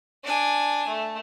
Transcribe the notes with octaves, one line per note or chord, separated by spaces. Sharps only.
D4 G#5
A3